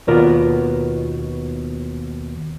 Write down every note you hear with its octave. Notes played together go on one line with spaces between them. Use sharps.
D#2 B2 B3 F4 A#4 D5